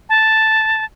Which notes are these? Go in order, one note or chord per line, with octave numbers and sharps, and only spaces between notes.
A5